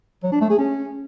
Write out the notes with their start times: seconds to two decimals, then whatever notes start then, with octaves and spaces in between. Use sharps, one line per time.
0.23 F#3
0.32 D4
0.41 A3
0.50 G#4
0.59 C#4